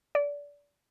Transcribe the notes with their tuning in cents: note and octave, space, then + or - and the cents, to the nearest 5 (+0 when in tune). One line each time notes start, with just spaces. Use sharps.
D5 -25